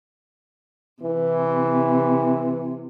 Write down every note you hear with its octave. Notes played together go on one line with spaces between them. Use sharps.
C3 E3